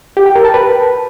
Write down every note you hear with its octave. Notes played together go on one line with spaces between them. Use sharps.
G4
G5
A#4
A5
B4